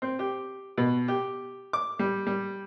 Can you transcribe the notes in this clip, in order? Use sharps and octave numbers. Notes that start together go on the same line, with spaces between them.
C4
G4
B2
G4
D6
G3
G3